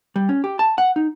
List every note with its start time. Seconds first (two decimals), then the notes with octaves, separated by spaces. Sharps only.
0.16 G3
0.29 C#4
0.44 G4
0.59 A5
0.78 F#5
0.96 D#4